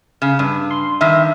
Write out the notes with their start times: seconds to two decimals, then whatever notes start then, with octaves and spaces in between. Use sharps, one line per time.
0.22 C#3
0.39 G2
0.70 C6
1.01 G2 D#3 E5